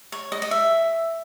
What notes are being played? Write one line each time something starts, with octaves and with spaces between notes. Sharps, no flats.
C#5
D#5
D#5
E5